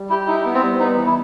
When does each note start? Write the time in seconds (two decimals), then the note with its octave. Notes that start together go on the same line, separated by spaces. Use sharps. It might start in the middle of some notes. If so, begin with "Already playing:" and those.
Already playing: G3
0.10 E4 G4
0.27 D#4 E4
0.45 B3
0.54 C4
0.62 G3
0.80 B3 D#4
0.97 E3
1.07 E4